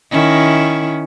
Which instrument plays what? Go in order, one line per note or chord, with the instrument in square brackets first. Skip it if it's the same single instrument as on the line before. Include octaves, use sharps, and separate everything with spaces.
[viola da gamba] D#3 C#4 E4